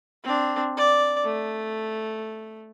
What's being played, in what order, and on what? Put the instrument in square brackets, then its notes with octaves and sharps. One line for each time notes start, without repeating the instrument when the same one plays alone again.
[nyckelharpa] C4 D4
D5
A3